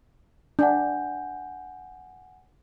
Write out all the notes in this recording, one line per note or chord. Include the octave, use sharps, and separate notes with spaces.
D4 F#5 G#5 G6